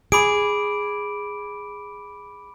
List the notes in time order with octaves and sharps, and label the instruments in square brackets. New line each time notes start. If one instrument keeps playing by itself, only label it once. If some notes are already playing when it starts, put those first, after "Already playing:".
[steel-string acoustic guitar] G#4 [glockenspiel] B5 D6 D7